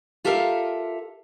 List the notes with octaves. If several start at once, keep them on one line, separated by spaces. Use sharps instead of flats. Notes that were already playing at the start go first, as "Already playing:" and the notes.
F4 G4 A4 A#4 E5 F5